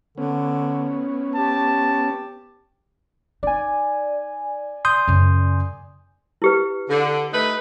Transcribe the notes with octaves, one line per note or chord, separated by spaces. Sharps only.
D3 B3 C#4
G4 A5
D#4 D5 G#5
C6 D#6 G6
F#2 C#3
E4 G4 B4
D3
A3 D#4 B4